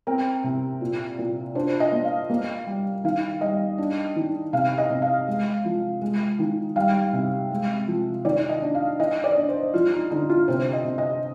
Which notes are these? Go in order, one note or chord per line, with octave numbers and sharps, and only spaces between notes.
C4 A#4
C3
A#2
A#2
D4 C5
D#5
A#3
F5
A#3
G3
D#3 F5
G3 D#5
D4
D#3
C3 F5
D#5
C3
F5
G#3
F3
G#3
D#3
G3 F5
C3
G#3
F3
D#3 D5
D#5
D4
F5
D#3 D#5
D5
D4
C5
F3 F4
D#4
D3 D#4
F4
C3 C5
D#5
C3
D#5